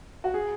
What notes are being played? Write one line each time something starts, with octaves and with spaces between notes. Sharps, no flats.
F#4
G#4